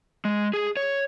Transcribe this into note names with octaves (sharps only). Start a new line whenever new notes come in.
G#3
G#4
C#5